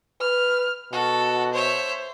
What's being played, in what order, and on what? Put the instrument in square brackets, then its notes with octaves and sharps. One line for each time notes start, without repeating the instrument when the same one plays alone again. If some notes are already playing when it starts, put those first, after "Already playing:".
[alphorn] B4 [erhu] F6
[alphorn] B2 [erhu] F#4 [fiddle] A4
[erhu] C5 [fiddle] C#5 E5